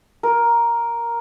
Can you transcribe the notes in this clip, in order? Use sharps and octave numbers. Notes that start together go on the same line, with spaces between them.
A#4